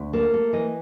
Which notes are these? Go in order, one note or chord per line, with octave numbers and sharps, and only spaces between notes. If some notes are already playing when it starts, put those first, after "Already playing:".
Already playing: D2
A#3 A4
A4
E3 D#5